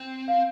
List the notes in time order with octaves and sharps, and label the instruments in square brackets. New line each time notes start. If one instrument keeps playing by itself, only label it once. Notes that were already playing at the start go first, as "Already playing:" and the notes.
Already playing: [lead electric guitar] C4
[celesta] F5